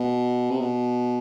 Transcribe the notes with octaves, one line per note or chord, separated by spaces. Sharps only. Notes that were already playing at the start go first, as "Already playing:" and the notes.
Already playing: B2
C3
B2